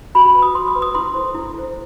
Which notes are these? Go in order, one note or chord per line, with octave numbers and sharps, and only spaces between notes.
F#4 B5
B4
D#6
F#4 C6
D#6
B4
D#6
E4 C6
A4 C5
E4
A4 C5